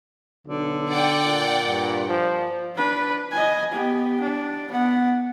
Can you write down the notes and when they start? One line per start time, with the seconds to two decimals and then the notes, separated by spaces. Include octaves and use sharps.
0.47 B1 D3
0.91 D5 F#5 G5
1.25 A#2
1.63 G2
2.09 F3
2.76 D4 B4
3.32 D#5 G#5
3.72 B3 G4
4.21 D4
4.71 B3 F#5